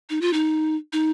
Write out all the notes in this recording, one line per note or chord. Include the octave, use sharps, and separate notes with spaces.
D#4
F4
D#4
D#4